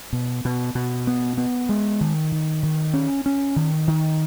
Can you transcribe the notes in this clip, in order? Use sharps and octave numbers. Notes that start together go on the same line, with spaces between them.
B2
B2
B2
B3
B3
G#3
D#3
D#3
D#3
C#4
C#4
D#3
D#3